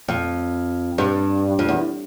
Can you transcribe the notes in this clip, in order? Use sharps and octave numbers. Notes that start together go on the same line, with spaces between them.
F2
G2
F2
E2